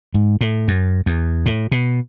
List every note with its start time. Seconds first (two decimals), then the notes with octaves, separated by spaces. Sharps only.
0.14 G#2
0.41 A2
0.68 F#2
1.06 E2
1.46 A2
1.72 B2